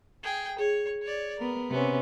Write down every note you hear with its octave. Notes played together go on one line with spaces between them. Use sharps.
G#4 G5
G#4 C#5
C#5 D5
B3 A#4
C3 B3 C#4